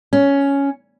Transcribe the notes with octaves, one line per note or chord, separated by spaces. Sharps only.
C#4